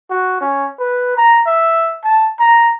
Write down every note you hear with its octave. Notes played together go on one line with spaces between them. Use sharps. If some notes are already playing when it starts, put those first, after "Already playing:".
F#4
C#4
B4
A#5
E5
A5
A#5